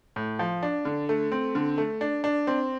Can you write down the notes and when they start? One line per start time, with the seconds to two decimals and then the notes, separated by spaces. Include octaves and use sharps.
0.16 A2
0.39 F3
0.63 D4
0.85 D3
1.09 A3
1.32 C4
1.55 D3
1.78 A3
2.01 D4
2.24 D4
2.47 C4